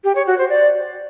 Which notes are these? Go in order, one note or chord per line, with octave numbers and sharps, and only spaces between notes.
G4
C#5
F#4
C5
D5